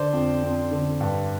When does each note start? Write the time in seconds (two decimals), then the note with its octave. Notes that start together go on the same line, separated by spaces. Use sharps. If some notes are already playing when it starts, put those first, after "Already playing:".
Already playing: D3 C5 D5
0.13 F2
0.43 F2
0.71 D3
1.01 G2